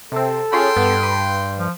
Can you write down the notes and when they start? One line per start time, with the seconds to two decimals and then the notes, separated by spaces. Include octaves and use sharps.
0.12 C3 C4 A4
0.53 C#4 F4 G#4 G5 C6
0.77 G2 B3
1.03 B4
1.59 F3